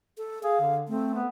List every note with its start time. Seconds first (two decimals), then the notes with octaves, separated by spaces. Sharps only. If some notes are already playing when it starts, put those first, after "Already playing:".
0.18 A4
0.43 G#4 F5
0.61 D3
0.88 A3 C4
1.14 B3